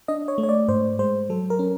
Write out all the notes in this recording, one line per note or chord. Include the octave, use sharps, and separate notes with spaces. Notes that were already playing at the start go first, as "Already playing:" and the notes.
D4 D#5
C#5
A3
C#5
D5
G#2 C5
G#3 C5
F#3 A4
A#4
C#4